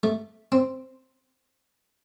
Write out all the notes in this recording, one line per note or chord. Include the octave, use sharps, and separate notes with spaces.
A3
C4